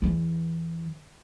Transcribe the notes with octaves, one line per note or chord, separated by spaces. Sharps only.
E2 E3